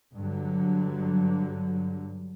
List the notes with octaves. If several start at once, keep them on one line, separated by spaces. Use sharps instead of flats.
G2 D3 F#3